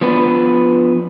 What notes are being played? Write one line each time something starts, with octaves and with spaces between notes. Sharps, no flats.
F3 B3 D4 B4